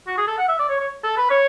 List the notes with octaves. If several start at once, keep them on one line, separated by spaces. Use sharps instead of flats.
F#4
G#4
A4
F#5
E5
D5
C#5
C#5
A4
B4
C#5